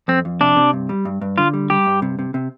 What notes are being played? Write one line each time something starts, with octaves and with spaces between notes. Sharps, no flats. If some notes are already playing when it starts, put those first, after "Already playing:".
F2 C4
F2
C3 D4
C3
G2
G3
G2
G2
D3 F4
G3
G3 G4
G2
C3
C3
C3